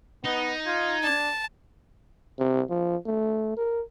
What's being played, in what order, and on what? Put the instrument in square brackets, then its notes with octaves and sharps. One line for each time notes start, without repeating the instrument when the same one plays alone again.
[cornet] B3 [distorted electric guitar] D#4
[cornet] F4 [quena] G#6
[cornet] D4 [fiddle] A5
[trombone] C3
F3
A3
A#4